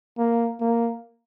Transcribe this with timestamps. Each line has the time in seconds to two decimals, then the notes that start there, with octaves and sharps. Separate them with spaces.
0.18 A#3
0.60 A#3